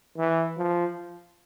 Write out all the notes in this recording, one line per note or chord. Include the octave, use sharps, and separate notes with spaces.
E3
F3